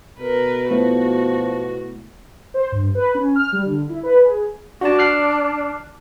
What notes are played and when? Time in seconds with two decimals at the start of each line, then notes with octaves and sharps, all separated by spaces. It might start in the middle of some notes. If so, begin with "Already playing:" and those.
0.19 B2 A#4 B4
0.70 F3 A3 B3 E4 F#4
2.54 C5
2.72 G2
2.95 B4
3.15 C#4
3.36 F6
3.52 G3
3.65 D3
3.89 E4
4.03 B4
4.25 G#4
4.81 D4 F#4 A5
4.99 F6 F#6 C7